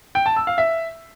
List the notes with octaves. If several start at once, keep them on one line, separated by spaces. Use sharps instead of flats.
G5
A5
E6
F5
E5